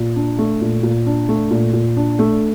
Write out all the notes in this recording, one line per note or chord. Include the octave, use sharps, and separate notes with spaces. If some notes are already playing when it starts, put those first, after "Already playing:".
Already playing: A#2
D4
A3
A#2
A#2
D4
A3
A#2
A#2
D4
A3